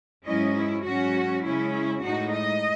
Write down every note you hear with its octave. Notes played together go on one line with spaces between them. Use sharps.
G#2 F#3 C#4 E4 D#5
E4
G#2 F#3 C#4 F#4
C#3 G#3 C#4 E4
E4
A2 G#3 D#4 F#4
D#5